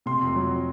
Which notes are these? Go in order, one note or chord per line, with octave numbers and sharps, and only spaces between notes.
C3 C6
F2
F#3